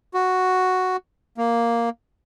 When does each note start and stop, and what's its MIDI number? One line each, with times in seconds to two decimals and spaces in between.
0.14 0.97 66
1.38 1.89 58